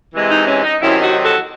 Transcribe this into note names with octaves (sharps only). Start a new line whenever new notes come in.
C3 E3 G#3
D#4
C#4
D#4
C3 D#3 F#3 C4 C#4 E4
D#4 F#4
F#4 A4